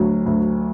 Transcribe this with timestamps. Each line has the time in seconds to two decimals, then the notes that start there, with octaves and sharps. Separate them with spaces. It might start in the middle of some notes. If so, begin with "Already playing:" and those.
Already playing: D2 F#3
0.26 D2